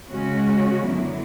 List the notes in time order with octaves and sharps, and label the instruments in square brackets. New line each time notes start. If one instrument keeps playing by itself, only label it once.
[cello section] C#3 G#3 C#4 F#4
F#2 D3 F#3 B3 E4